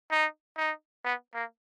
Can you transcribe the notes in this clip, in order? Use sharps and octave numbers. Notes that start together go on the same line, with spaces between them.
D#4
D#4
B3
A#3